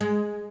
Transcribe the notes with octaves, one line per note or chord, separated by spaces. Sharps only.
G#3